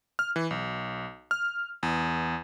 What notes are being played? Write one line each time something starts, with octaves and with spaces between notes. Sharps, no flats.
F6
E3
B1
F6
E2